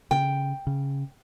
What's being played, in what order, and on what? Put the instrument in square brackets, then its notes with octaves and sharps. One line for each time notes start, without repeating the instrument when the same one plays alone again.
[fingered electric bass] C#3 [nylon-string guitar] G5
[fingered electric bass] C#3